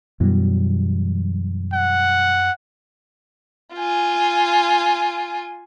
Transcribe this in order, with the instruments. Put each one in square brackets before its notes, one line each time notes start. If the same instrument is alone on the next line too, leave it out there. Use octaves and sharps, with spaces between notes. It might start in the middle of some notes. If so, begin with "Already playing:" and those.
[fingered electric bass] F#2 G3 [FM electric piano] B2 E3 F#3
[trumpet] F#5
[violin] F4 G#5